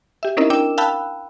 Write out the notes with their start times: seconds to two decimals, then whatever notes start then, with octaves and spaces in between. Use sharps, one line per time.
0.23 G4 E5
0.37 C4 C#4 D#4 E4 A#4 D#5
0.50 D4 A#4 G5 D6 E6 E7
0.78 F5 G5 A5 B5 E6 F#6